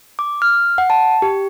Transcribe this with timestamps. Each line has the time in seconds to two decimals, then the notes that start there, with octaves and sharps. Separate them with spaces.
0.19 D6
0.42 F6
0.78 F#5
0.90 A5
1.22 G4